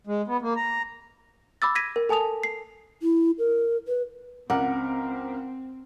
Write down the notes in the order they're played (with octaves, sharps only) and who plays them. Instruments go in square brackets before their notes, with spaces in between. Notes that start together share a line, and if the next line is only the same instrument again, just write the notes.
[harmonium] G#3
B3
A#3
A#5
[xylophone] B5 D6 E6 A6
G#6 A#6 B6 D#7
A#4
A4 G#5 A5 D#6 F7
C7
[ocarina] E4
A#4
B4
[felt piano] C#2 A#4 D6 [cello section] C4 [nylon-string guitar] F#5